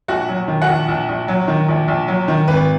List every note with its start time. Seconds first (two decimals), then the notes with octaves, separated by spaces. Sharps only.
0.08 A#1 F#4 F#5
0.28 F#3
0.48 D#3
0.62 F#4 F#5
0.68 A#1
0.88 A#1
1.09 A#1
1.28 F#3
1.48 D#3
1.69 A#1
1.88 A#1
2.08 F#3
2.28 D#3
2.48 G#1 B4